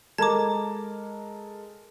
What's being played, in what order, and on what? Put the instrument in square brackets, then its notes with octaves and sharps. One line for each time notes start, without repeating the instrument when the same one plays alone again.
[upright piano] G#3 A4 A#4 [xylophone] A5 D6 [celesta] A#5 G#6